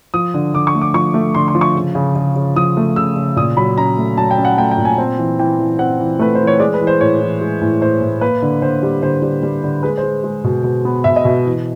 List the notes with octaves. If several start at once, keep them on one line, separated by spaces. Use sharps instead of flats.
F3 D#6
D3
D3 D6
C#6
A3
D6
F3 C#6
A3
D3 C6
C6
F3
C#6
C#3
C#3
C#3
C#3
F3 D#6
A3
C#3 E6
C#3
A#2 D#6
F#3 B5
C#4 A#5
A3
F#3 A5
G5
C#4
F#5
A3 G5
G5
A#2
G#5
C4
E3
E3 G5
E3
C4 F#5
E3
A3 B4
E3 C5
C#5
G#3 D5
B4
E3
C5
A2 C#5
E3
G#3
A2
A2 C5
A2
A#3 B4
D3
D3 C5
G3
D3 C5
G3
G3
D3
G#3 B4
C5
G#3
G#3
B2
B2
B3
B2 E5
D#5
B2 E5
E3